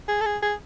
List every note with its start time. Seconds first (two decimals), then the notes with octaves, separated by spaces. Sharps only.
0.08 G#4
0.21 A4
0.26 G#4
0.43 G#4